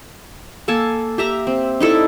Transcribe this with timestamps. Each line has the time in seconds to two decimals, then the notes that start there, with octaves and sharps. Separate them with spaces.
0.68 A#3 A4 G#5 A5
1.18 G4 E5 A#5
1.47 C4
1.80 D#4 E4 A4 D5